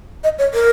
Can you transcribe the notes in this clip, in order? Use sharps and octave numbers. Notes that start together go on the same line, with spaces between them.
D#5
C#5
A#4